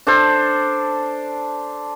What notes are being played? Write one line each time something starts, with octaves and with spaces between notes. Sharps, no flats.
D4 A4 C5